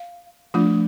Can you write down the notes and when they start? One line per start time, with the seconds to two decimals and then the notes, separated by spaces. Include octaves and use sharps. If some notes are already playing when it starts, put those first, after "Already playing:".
Already playing: F5
0.54 F3 A3 D4 F4